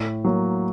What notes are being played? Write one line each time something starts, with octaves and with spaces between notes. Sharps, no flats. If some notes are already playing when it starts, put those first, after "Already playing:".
Already playing: A2
F#3 A#3